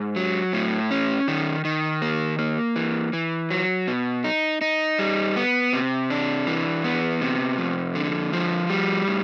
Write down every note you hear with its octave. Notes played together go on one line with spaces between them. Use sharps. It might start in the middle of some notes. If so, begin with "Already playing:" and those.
Already playing: G#2
F#3
A2
C#4
D#3
D#3
A#3
A#3
E3
E3
F#3
B2
D#4
D#4
G3
B3
C3
D4
E3
B3
C3
F2
D3
F3
G3
A2